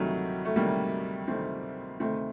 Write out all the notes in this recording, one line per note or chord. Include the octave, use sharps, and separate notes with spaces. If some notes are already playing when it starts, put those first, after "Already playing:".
Already playing: D2 C3 D#3 F#3 G3 A3
A3
D2 C3 D#3 G3 A#3
D2 C3 D#3 A3 C4
D2 C3 D#3 A3 C4